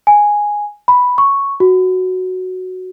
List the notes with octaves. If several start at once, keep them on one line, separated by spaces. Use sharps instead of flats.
G#5
B5
C#6
F#4